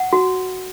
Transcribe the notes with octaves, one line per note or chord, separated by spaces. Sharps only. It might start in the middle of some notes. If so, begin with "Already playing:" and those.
Already playing: F#5
F#4